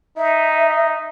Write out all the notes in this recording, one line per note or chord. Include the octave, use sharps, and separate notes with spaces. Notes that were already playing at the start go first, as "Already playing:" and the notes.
D#4 E5